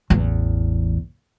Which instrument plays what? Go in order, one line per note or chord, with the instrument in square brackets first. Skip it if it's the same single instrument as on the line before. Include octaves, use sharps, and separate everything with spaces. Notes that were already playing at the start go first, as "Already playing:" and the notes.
[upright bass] A1 E2